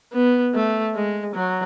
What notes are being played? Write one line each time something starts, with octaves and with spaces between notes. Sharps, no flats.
B3
A3
G#3
F#3